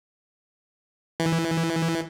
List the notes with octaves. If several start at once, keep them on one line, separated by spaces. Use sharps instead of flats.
E3